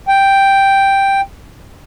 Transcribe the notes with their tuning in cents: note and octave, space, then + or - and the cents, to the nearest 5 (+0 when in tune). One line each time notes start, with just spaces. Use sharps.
G5 +0